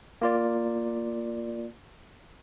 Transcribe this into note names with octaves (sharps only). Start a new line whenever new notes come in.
A#3 F4 D5